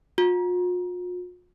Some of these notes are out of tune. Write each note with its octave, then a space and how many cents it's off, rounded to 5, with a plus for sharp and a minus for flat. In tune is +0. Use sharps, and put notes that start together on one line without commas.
F4 +45